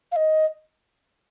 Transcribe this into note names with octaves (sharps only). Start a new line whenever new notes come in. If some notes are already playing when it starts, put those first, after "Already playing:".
F5
D#5